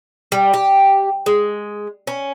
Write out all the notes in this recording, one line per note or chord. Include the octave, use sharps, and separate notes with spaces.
G3
G4
G#3
C#4